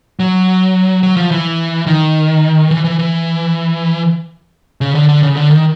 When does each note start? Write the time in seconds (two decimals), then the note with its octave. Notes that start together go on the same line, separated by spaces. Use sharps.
0.20 F#3
1.03 F#3
1.17 F3
1.31 E3
1.87 D#3
2.71 E3
2.84 E3
2.99 E3
4.81 C#3
4.95 D3
5.09 D3
5.23 C#3
5.37 D3
5.51 D#3